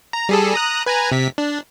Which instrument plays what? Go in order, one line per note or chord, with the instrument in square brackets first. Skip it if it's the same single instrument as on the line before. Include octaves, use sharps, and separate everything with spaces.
[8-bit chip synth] A#5
G3 G#4 A4
A#5 D#6 F#6
B4 G#5 A#5
C3 B6
D4